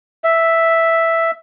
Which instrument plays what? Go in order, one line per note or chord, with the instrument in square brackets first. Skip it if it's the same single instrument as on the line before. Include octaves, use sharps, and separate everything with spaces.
[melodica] E5